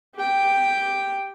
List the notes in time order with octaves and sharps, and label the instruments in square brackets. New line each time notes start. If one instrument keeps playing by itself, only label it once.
[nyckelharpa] G4 G5